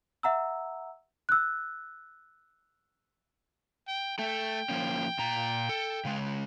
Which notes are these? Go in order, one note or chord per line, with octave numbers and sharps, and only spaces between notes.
E5 F#5 A#5 E6
E6 F#6
G5
A3 A4 G5
F3 A#3 C#4
A#2 A#5
A4
C#3 G#3